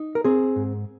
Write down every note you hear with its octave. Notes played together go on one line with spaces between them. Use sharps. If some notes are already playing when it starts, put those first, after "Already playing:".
Already playing: D#4
A#4
C4 G#4
G#2